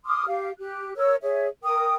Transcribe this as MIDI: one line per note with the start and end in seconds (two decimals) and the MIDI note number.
0.05 0.25 84
0.05 0.25 86
0.05 0.25 87
0.05 0.25 89
0.27 0.50 67
0.27 0.50 77
0.58 0.94 67
0.58 0.94 90
0.96 1.16 70
0.96 1.16 73
0.96 1.16 88
1.22 1.48 68
1.22 1.48 73
1.22 1.48 76
1.63 1.96 70
1.63 1.96 79
1.63 1.96 87